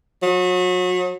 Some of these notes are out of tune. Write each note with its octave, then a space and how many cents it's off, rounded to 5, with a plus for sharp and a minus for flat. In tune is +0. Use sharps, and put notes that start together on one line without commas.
F#3 -35